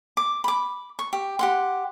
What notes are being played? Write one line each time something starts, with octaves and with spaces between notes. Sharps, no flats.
D6
B5 D6
C#6
G4
G4 F#5 C6